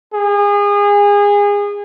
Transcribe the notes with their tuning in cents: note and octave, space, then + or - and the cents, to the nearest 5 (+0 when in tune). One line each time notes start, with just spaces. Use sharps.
G#4 -30